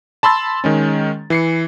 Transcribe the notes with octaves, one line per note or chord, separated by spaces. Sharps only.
A5 B5 C6 E6 A6
D#3 G#3 C#4
E3 C7 C#7